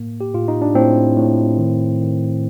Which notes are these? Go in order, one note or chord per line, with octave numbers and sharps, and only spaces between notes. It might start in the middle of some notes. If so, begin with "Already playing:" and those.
Already playing: A2 A#3
G4
A2 F4
D#4
D4
A2 C4
A2
D#3
D#3